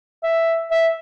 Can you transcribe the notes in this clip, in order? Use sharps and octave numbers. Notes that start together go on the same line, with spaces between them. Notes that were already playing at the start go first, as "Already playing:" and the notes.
E5
E5